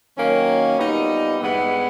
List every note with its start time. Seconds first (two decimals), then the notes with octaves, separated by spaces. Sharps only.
0.16 D#3 F#3 A#3 C#4
0.77 A#2 G3 B3 D#4
1.39 G2 E3 G#3 B3 E4